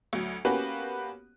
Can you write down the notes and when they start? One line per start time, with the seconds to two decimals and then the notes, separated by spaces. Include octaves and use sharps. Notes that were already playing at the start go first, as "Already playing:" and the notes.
0.13 D2 F#3
0.45 A#3 B3 C#4 F#4 G4 B4